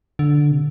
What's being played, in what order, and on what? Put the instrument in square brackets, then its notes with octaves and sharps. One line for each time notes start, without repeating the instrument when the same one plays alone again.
[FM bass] D3
C3